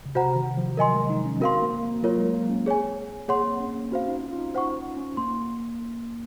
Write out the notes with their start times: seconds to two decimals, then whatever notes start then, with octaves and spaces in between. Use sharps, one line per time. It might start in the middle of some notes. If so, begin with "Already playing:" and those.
0.06 C#3
0.15 C3 F#4 C5 F#5 A#5
0.36 D#3
0.57 F3
0.77 F#3 A#4 D#5 G#5 C6
0.94 G#3
1.10 D#4
1.25 C#4
1.40 C4 F#4 A#4 F5 C6
1.61 A#3
1.83 A#3
2.03 F#3 F4 A#4 C#5
2.18 G#3
2.34 A#3
2.50 C#4
2.66 C4 G#4 C#5 G#5
3.28 A#3 G#4 C#5 F#5 C6
3.44 C4
3.61 C#4
3.76 A#3
3.91 C#4 F#4 C5 F5
4.08 D#4
4.22 F4
4.32 F4
4.39 D#4
4.54 D#4 C5 F#5 C#6
4.97 C#4
5.17 A#3 C6